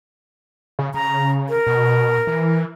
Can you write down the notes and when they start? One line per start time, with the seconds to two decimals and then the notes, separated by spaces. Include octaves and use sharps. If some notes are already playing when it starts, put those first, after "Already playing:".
0.79 C#3
0.94 C#3 A#5
1.49 A#4
1.67 B2
2.27 E3